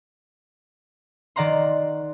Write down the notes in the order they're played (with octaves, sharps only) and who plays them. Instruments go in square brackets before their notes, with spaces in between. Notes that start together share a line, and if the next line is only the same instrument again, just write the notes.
[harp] D#3 D5 F#5 A#5 C6